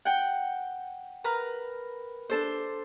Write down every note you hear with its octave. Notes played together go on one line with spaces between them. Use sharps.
F#5 G5
A#4 B4 A#5
D4 A4 C5